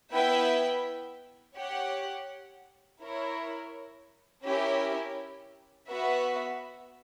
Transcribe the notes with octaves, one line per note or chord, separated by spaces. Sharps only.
B3 E4 B4 E5 G5
G4 C#5 F#5
E4 A#4 C#5
C#4 E4 G4 A#4
B3 F#4 B4 E5